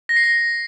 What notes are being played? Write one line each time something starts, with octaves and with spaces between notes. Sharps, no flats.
A#6
C7
A#6